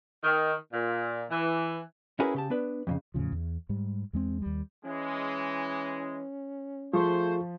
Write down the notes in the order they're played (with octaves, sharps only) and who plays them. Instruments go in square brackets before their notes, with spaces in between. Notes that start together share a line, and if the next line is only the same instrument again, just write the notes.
[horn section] D#3
A#2
E3
[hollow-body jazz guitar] C#4 E4 F#4 G#4 A#4 B4
C#3 G4 A5
B3 D4 B4
F2 A2 C#3
[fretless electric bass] E2 A2 C#3 F3
E2
G#2 G3
E2 G#3 C4
D#2 G3
[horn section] E3 G#3 [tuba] C#4
[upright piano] F3 [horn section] A3 C5 [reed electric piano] F4 G#4 C#6